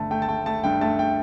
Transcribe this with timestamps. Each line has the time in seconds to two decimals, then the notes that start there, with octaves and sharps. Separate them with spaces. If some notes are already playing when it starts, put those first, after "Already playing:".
Already playing: G1 A3 A5
0.11 A3 G5
0.22 A5
0.28 A3 G5
0.46 A3 A5
0.64 G2 G5
0.81 A3 A5
0.99 G5